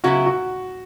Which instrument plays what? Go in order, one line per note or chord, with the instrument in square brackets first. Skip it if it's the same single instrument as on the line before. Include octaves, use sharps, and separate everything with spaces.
[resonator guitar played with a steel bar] C#3 F#3 B3 E4 [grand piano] F#4
[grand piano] F#4